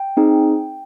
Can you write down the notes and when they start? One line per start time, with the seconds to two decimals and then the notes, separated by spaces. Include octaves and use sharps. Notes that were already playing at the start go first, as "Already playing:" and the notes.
Already playing: G5
0.17 C4 D#4 G#4